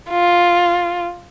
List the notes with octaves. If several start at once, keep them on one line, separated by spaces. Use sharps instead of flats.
F4